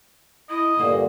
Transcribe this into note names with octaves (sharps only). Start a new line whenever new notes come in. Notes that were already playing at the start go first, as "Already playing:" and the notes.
E4 D#5
G2 A#2 D3 A#3